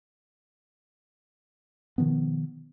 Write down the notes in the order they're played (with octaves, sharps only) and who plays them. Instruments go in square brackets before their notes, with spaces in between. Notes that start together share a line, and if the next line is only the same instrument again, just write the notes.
[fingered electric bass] B2 D#3 F3 B3